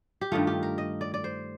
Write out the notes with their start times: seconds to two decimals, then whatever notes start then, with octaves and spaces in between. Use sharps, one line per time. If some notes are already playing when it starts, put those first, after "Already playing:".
0.21 G4
0.32 G2 D#3 A3 F4
0.47 G4
0.63 A#4
0.78 D#5
1.01 D5
1.14 D5
1.24 C5